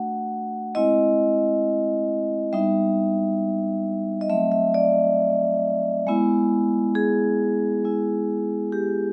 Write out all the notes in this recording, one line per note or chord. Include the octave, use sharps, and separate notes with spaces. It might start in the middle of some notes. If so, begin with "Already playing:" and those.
Already playing: A3 D4 F#4 F#5
G#3 C4 E4 D#5
G3 B3 D#4 E5
D#5
F#3 A3 C4 E5
E5
D5
G#3 B3 E4
G#4
G#3 B3 E4
G4